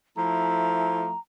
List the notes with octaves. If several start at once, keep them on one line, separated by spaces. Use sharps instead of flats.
F3 A3 E4 A#5